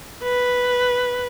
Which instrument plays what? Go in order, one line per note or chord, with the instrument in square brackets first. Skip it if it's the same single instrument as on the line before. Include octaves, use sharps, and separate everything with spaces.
[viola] B4